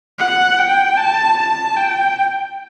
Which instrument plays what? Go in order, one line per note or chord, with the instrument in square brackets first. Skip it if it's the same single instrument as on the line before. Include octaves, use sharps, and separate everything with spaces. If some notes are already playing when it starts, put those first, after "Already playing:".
[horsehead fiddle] F#5
G5
A5
A5
G5